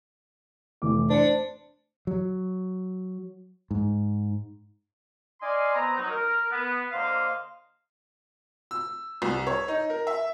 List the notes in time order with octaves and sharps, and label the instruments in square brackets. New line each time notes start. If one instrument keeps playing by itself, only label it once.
[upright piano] F1 E3 D6
[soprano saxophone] D4 [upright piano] C5 C#7
[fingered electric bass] F#3
G#2
[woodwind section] D5 D#5 F5 G#5 C6
B3 C4 C5 A#5
F#3 D#4
A#4
B3
D3 A#3 C5 D#5 F5
[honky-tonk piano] E6
C2
C#5
D#4
A#4
E5